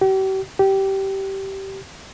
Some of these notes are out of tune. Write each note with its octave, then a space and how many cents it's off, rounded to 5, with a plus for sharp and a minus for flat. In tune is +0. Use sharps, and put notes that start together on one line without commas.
G4 -40
G4 -15